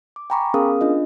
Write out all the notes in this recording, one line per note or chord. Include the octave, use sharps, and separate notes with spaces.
D6
G5 G#5 A#5 B5 C#6 D6
B3 C#4 G#4 A#4 F5 D#6
D4 F4 D#5